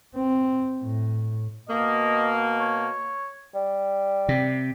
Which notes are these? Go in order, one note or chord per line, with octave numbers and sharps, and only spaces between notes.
C4
A2
B2 A#3 D#5
C#5
G3
C3